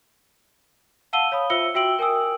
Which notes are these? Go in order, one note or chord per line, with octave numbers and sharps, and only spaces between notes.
F5 F#5 A5 E6 D#7 G7
C#5 F5 B5 D#6
F4 C5 E5 E6 C#7 G7
F#4 E5 G5 E6 D7 F#7
A#4 G5 G#5 D#6 E6